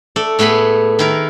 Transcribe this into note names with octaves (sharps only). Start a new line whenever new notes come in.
A3 A4 D5
A2 A3 B3 G#4 B5
D#3 E4 A#4